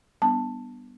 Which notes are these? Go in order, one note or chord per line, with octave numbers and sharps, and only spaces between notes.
G3 B3 D4 A5